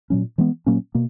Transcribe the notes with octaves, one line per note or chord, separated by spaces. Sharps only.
A#2 F#3 C#4
E3 G#3 B3
A#2 F#3 A#3 C#4
B2 A#3